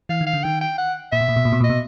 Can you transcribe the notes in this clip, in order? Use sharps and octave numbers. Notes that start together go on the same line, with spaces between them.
E3 F5
D#3
F5
D3
D#3 G5
G5
F#5
A#2 E5
B2
A#2
B2
A#2
B2
A#2
D#5
B2